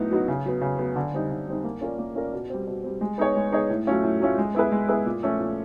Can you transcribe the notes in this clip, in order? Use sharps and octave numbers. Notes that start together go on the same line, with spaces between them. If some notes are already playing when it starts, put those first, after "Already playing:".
Already playing: A2 F#3 B3 D#4 F#4
F#3 B3 D#4 F#4
C#3
F#3 B3
C#3
F#3 B3
D3
G3 C4 D#4
D3
G3 C4 D#4
A#3
C#4 F4 A#4 D5
A#3
C#4 F4 A#4 D5
B2
G3 C4
B2
G3 C4
G#3
B3 D#4 G#4 C#5
G#3
B3 D#4 G#4 C#5
A2
F#3 A3 C#4 F4
A2
F#3 A3 C#4 F4
G#3
B3 E4 G#4 B4
G#3
B3 E4 G#4 B4
A#2
F3 A3 C#4
A#2